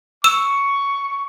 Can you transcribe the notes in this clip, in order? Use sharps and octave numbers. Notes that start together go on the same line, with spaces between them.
C#6 E6 E7